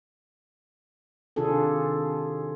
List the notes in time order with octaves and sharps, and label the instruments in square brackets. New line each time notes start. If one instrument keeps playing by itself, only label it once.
[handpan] C3 D#3 D4 F4 G#4 A4